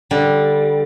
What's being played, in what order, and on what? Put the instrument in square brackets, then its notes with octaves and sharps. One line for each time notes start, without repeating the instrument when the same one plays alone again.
[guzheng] D3 G3